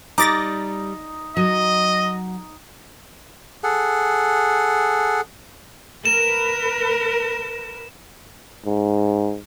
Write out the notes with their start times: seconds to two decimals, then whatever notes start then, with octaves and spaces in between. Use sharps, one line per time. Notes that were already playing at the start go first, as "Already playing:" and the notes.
0.18 G3 D#4 D6 A6 A#6
1.37 F#3 D#5
3.63 G#4 A4 F#5
6.05 A#4 B4 E7
8.66 G#2